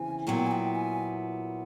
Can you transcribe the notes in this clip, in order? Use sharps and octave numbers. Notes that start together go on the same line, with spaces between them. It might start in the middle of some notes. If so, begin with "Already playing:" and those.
Already playing: E2 C#3 E3 C4 G#5
A#2 F#3 B3 E4 G5
G#5
G5
G#5